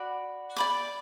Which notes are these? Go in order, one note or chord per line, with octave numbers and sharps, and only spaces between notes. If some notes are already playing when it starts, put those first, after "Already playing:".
Already playing: F#4 D5 B5
D5 B5 D6